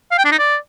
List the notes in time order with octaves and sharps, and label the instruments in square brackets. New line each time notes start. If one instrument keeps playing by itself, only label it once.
[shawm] F5
G5
D4
D#4
D5